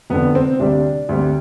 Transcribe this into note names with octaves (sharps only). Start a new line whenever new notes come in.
F1 F2 D3 B3
C4
D2 C3 G3 D4
D2 C3 G3